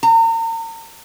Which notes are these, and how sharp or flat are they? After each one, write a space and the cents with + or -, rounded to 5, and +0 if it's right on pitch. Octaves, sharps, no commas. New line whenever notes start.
A#5 -40